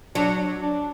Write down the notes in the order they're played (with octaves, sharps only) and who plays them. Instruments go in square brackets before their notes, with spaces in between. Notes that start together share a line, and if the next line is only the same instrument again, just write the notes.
[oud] F#3 [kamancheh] D4
[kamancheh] D4